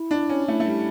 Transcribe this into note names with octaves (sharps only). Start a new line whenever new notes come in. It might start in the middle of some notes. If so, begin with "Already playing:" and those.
Already playing: E4
D4
C#4
A3 E4
A3
G3